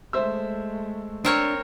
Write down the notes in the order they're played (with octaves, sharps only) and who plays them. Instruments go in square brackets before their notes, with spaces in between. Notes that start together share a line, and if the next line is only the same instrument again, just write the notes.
[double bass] G#3 A3 [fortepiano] C5 E5 E6
[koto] C4 A#4 C#5 [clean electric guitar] D4